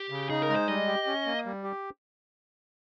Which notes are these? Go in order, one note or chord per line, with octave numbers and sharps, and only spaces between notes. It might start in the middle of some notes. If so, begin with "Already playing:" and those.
Already playing: G4
C#3
D#4 G#4
A#4
G#3
C5
G3 D#5
G4
C#4
A#3
G3
G4